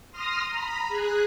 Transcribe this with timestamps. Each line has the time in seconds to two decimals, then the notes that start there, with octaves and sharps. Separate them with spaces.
0.11 C6 D#6 F6 A#6
0.50 A#5 B5
0.88 G#4 F#6